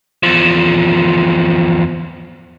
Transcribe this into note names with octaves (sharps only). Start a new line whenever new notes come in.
E2 F3